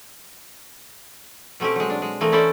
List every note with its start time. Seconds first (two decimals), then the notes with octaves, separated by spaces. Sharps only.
1.60 B2 A3 C4 C#4 G4
1.76 F#3 G#3
1.90 D4
2.02 G#3
2.21 E3 A3 A#3 C4 D#5
2.32 C#4 E4 A4 C5 D5